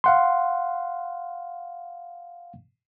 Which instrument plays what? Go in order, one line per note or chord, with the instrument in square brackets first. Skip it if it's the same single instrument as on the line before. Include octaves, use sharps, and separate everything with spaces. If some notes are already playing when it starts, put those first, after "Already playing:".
[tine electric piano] F5 F#5 C6